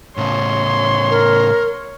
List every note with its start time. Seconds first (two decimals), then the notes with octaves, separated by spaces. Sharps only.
0.17 A2 C#3 C#5 C6
1.11 A#4